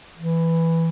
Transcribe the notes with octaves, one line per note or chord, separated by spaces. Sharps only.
E3